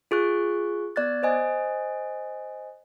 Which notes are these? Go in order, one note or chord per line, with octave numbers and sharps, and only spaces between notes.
F4 G#4 C#6 F#6
B3 D5 F#6 A6
C5 D#5 G#5